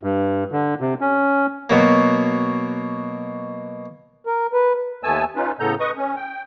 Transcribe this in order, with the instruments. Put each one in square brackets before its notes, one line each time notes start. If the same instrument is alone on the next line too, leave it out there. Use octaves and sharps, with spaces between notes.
[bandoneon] G2
D3
C3
C#4
[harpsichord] B2 F#3 A#3
[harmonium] A#4
B4
[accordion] D#2 A3 B3 G#5 A5 E6
C#4 D#4 F4 B4
A2 C#3 B3 A4 A#5 G6
B4 D#5 C#6 D#6
C#4
G5